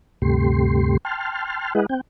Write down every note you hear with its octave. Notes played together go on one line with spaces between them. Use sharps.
D2 G2 C3 A3 G4 C6
G5 A5 C6 F6
G#3 E4 G#4 B4 D#5 F#5
C4 G5